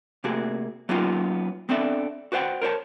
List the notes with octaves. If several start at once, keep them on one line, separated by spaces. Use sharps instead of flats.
C3 A3 A#3 F#4 G#4
F#3 A#3 B3 C#4 D#4 F4
B3 C4 D4 A4 D5 E5
F#4 B4 C5 E5 F#5 G5
A#4 C5 C#5 A5